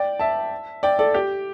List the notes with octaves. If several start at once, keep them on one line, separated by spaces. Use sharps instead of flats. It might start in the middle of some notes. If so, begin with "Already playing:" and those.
Already playing: D5 G5
E5 A5
D5 G5
A4 D5
G4